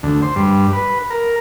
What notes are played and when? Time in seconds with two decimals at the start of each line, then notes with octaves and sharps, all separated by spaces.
0.03 D2
0.22 C5
0.36 G2
0.73 B4
1.10 A#4